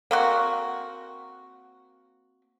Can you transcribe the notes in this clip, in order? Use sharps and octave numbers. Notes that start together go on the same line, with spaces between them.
A#3 C4 F#4